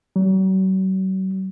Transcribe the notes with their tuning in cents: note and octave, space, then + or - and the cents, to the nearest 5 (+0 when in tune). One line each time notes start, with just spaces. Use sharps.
F#3 +40